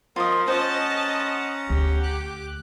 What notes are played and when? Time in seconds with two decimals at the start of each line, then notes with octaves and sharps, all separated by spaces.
0.16 F3 F4 A#4 D#5
0.48 C#4 C5 D#5 F#5 A5 A#5
1.70 D2 G4
2.03 D6 F#6